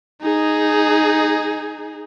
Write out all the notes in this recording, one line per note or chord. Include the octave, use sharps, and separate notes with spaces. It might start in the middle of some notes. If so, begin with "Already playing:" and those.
D#4 G#4